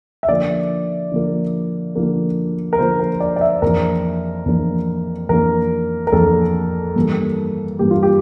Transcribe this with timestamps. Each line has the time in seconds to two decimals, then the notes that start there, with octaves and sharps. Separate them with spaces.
0.23 E5
0.28 D3 F3 A#3 D5
1.12 D3 F3 A#3
1.95 D3 F3 A#3
2.73 A#4
2.79 D3 F3 A#3 C5
3.00 A#4
3.20 D5
3.36 D5
3.41 E5
3.62 F2 E3 A#3 D4 A#4
4.46 F2 E3 A#3 D4
5.29 F2 E3 A#3 D4 A#4
6.07 A#4
6.12 F2 E3 A#3 D4 A4
6.96 G2 E3 A#3
7.79 G2 E3 A#3 G4
7.91 F4
8.03 G4